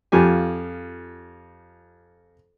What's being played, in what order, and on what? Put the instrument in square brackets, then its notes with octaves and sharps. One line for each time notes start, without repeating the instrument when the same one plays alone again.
[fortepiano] F2 F4 G4 G#5